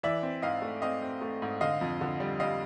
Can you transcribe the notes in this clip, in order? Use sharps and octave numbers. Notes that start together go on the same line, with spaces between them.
E3 D5 E5
C4
G#2 D#5 F5
A3
C4 D#5 F5
C4
A3
G#2
D3 D#5 F5
F2
D3
G3
G3 D#5 F5